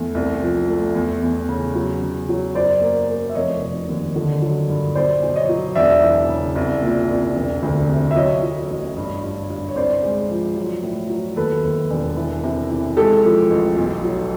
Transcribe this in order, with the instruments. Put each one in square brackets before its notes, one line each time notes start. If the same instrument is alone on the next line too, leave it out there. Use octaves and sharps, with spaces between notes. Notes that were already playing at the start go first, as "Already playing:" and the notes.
Already playing: [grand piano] E2 A3
C2
F3
A3
E2
E2
C#3
F#3
C#3
F#3
F#2 C5 D5
A#3
A#3
E5
F1 C#5 D#5
F1
D#2
D3
F#3
G2
B1 C5 D5
B1
C#5 D#5
F#3
E1 D5 E5
E3
C#3
C2
A#2
C2
E1
D2
C3
E5
F#3 C#5 D#5
F#3
A1
G2
G2
G2
C#5
C2 C5 D5
G#3
F3
F#3
A2
F#3
D#2 A4 B4
D#2
E1
E3
C3
E3
G#3 G4 A4
F3
A1
B1
F#3